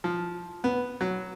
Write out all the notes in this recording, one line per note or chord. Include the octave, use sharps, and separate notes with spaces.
F3
B3
F#3